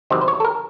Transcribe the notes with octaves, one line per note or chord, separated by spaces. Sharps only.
E2 C3 D#3 F#3 C5
C5
C#5
A4
A#4